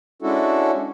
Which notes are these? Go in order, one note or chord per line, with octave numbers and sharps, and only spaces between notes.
G#3 C#4 D4 E4 F#4 A4